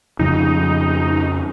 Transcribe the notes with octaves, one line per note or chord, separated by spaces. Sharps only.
F2 C#3 F3 D#4